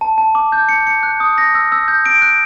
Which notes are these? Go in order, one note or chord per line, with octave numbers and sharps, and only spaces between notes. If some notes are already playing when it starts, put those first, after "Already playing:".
A5
A5
D6
G6
C#7
C#7
F#6
D#6
A#6
E6
E6
G6
D7
F#6